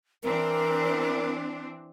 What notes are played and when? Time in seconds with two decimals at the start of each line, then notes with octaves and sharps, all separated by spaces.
0.23 E3 C4 D4 A#4